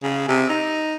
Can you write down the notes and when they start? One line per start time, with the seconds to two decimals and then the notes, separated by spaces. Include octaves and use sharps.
0.03 C#3
0.29 C3
0.50 D#4